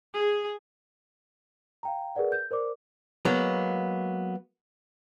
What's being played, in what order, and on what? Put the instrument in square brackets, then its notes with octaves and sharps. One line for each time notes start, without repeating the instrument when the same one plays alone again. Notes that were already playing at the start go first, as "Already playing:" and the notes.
[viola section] G#4
[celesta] F5 G5 A#5
G#4 A#4 B4 D5 F#5
G6
A#4 C5 D5 D6
[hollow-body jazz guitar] F#3 G#3 A#3 B3